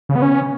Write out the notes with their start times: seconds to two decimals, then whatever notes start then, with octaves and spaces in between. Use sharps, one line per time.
0.09 C#3
0.16 B3
0.22 C#4